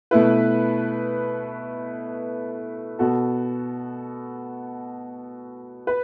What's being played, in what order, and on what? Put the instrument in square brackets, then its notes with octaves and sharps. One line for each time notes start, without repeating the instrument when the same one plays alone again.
[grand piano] B2 A3 E4 B4
B2 B3 F#4 A4
B4